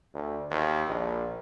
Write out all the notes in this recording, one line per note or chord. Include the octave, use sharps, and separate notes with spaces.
D2
D#2
A#1